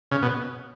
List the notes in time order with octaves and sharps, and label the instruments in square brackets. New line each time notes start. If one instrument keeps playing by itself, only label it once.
[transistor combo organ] C#3
B2